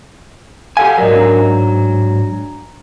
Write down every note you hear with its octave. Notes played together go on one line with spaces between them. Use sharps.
G4 A4 F5 F#5 G#5
G#2 F#3 A#4 D5 D#5
D4 A#5